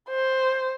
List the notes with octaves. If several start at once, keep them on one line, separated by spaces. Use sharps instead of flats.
C5